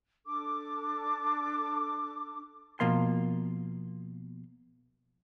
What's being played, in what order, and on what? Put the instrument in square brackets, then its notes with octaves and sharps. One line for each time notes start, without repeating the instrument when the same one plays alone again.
[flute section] D4 A4 D6
[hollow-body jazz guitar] B2 F3 A#3 C6